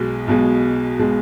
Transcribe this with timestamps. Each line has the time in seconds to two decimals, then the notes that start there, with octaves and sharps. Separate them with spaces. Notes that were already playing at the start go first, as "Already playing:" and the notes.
Already playing: B1 B2 G#3
0.28 B1 B2 G#3
0.99 B2 G#3